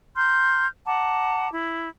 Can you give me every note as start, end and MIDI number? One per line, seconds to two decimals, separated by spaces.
0.16 0.66 82
0.16 0.66 84
0.16 0.66 89
0.16 0.66 91
0.85 1.49 78
0.85 1.49 81
0.85 1.49 82
0.85 1.49 86
1.50 1.87 64